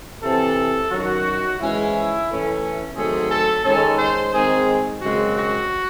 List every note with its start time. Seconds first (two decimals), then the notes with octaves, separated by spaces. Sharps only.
0.22 C3 E3 C4 A4
0.91 F#2 D#3 F#3 F#4
1.59 G#2 E3 G#3 C#4 E4
2.28 A2 E3 A3 C#4
2.96 D#3 F#3 A3 C4 G#4
3.30 A4
3.64 D#3 G#3 C#4 A4
3.99 C5
4.33 D#3 G#3 C4 G#4
5.01 F#2 C#3 G#3 C4 F#4
5.36 F#4